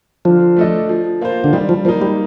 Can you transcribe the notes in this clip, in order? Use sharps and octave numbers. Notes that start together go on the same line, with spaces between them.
D3 F3
A3 D4 A4 D#5
F3
A#3 F4 C5
D3
D#3 G3
F3
F3 A#3 D#4
G3